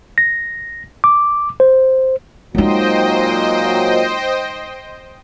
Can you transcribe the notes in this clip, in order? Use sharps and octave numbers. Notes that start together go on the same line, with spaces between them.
A#6
D6
C5
A#2 F#3 G#3 D#4 C5 D#5 G5